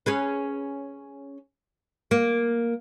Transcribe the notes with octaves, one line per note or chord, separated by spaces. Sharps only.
C#4 G#4 B4
A#3